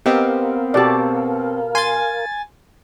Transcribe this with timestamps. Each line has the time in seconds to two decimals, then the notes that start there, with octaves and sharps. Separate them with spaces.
0.06 B3 C4 G4 A#4 D#5 F5
0.74 B2 F#4 G4 A4 D5
1.75 G#5 C6 A6